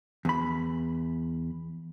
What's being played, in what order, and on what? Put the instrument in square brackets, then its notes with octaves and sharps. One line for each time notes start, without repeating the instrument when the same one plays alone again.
[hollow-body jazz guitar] E2 B5